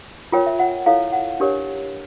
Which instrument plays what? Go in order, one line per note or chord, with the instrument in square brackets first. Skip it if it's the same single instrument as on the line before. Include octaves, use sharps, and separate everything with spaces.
[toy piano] F4 A#4 C#5 G5
E5
F#5
E4 A4 C#5 F5
F#5
D4 G4 A#4 C#5